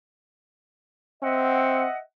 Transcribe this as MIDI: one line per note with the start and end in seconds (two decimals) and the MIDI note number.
1.23 1.86 60
1.23 1.98 75
1.23 1.98 76
1.23 1.98 78